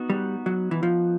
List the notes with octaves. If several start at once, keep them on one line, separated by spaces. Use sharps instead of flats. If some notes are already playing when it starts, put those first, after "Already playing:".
Already playing: B3 D#4 F#4
G3
F#3
E3
F3